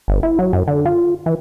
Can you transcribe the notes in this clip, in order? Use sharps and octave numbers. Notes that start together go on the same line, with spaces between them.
G1
E4
F#3
F#2
D3
F4
E3